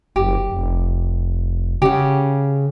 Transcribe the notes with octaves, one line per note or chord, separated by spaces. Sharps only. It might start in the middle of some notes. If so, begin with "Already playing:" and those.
F#1 G4
F1
C#3 G4 F#5